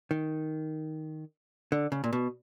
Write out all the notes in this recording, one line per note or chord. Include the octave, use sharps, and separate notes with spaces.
D#3
D3
C#3
A#2
B2